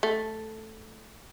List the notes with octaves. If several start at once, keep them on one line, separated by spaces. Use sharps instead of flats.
A3